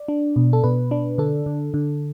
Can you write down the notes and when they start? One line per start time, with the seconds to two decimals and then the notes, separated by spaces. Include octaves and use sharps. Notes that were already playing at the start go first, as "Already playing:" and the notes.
Already playing: D5
0.08 D4
0.36 B2
0.53 A4
0.64 B2 B4
0.91 D4
1.18 D3 A4
1.46 D3
1.74 D3